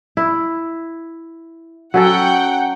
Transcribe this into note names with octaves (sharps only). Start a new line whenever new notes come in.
E4
F#3 C#4 A4 F#5 G5